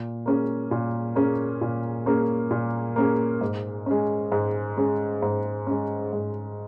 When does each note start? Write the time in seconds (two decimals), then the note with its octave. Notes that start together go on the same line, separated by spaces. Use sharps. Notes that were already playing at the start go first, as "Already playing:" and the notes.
Already playing: A#2
0.26 A#3 C#4 G#4
0.71 A#2
1.15 A#3 C#4 G#4
1.61 A#2
2.06 A#3 C#4 G#4
2.51 A#2
2.96 A#3 C#4 G#4
3.41 G#2
3.86 G#3 C#4
4.32 G#2
4.77 G#3 C#4
5.22 G#2
5.67 G#3 C#4
6.13 G#2